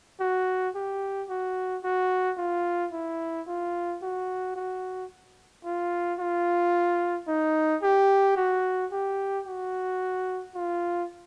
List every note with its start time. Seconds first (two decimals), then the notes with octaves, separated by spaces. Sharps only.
0.20 F#4
0.75 G4
1.30 F#4
1.84 F#4
2.38 F4
2.93 E4
3.48 F4
4.02 F#4
4.56 F#4
5.65 F4
6.19 F4
7.28 D#4
7.83 G4
8.37 F#4
8.92 G4
9.46 F#4
10.55 F4